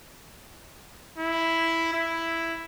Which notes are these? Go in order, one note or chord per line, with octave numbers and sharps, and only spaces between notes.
E4
E4